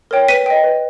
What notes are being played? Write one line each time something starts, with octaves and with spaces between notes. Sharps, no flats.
A#4 C#5 G5
B4 B6 D#7
D#5 G5
B4